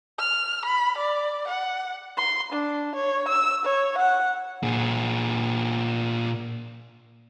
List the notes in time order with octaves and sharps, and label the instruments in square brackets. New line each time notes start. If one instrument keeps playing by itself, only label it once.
[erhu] F6
B5
D5
F#5
[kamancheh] C6
D4
C#5
E6
C#5
F#5
[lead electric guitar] A#2 G#4